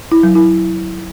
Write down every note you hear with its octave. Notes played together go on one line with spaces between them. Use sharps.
E4
F#3
E4